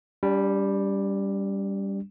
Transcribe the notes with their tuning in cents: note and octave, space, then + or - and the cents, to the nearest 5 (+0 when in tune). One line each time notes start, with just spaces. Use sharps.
G3 +5 D4 -40